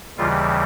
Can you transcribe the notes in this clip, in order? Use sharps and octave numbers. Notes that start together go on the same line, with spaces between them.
D#2 C#3 E3 G3 F4